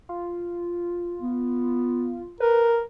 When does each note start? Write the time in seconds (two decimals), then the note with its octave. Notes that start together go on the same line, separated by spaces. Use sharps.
0.09 F4
1.21 B3
2.40 A#4 B4